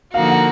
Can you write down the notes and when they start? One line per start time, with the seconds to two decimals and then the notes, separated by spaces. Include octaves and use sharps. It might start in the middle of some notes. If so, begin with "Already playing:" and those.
0.14 D3 F3 A#3 D#4 F#4 F5
0.30 F#5